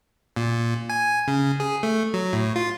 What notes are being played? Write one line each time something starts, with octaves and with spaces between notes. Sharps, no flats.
A#2
G#5
C#3
G#4
A3
F#3
A2
F4